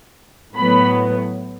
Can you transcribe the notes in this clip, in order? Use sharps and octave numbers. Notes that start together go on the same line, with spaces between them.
A2 F#3 B3 B5